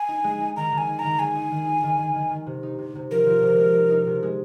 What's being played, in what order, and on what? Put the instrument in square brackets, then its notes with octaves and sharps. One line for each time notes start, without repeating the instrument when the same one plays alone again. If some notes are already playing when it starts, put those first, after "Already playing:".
Already playing: [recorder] G#5
[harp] D#4
G#3
D#4
[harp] D#3 [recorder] A#5
[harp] D#3
[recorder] G#5
[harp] D#4
[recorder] A#5
[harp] D#3
[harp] G#3 [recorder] G#5
[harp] D#4
D#3
D#4
D#3
D#3
D#3
D#3
C3
D#4
C3
C3
[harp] F3 [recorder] A#4
[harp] F3
C3
G#3
D#4
D#4
C3
G#3